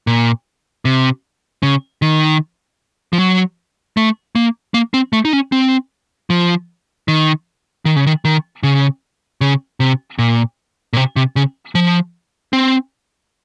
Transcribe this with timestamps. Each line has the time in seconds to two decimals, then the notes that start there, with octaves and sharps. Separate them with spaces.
0.07 A#2
0.85 C3
1.63 C#3
2.02 D#3
3.13 F3
3.18 F#3
3.97 A3
4.35 A#3
4.74 A#3
4.94 C4
5.13 A3
5.25 D#4
5.33 C#4
5.52 C4
6.30 F3
7.08 D#3
7.85 D#3
7.96 C#3
8.06 D#3
8.25 D#3
8.63 C#3
9.41 C#3
9.80 C3
10.19 A#2
10.93 A#2
10.97 C3
11.16 C3
11.36 C#3
11.75 F3
12.53 C4